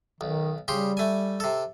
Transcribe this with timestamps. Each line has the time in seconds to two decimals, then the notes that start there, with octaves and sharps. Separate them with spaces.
0.21 B1 D#3
0.68 C#3 G3 G4 C6
0.97 A3 G#5
1.40 C3 A4